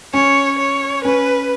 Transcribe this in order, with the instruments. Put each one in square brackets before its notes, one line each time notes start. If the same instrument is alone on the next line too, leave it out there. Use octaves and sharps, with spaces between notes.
[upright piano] C#4 [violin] C#5
[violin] C#5
[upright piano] C#4 [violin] B4